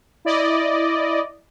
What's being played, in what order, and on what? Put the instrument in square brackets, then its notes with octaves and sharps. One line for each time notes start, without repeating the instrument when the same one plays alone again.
[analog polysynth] E4 D5 D#5